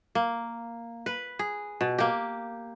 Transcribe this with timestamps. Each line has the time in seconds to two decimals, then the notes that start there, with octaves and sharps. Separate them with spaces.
0.15 A#3
1.06 B4
1.39 G#4
1.81 B2
1.98 A#3 G4